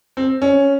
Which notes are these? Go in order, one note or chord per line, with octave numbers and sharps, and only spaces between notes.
C4
C#4